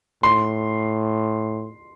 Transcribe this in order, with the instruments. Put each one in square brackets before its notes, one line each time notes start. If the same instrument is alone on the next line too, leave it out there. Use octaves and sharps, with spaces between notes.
[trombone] A2 [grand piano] C6